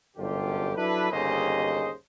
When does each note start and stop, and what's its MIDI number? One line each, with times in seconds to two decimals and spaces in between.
0.17 0.71 31
0.17 0.71 36
0.17 0.71 42
0.17 0.71 50
0.17 0.71 65
0.17 0.71 67
0.76 1.09 54
0.76 1.09 62
0.76 1.09 64
0.76 1.09 69
0.76 1.09 71
1.12 1.91 31
1.12 1.91 39
1.12 1.91 49
1.12 1.91 68
1.12 1.91 72
1.12 1.91 75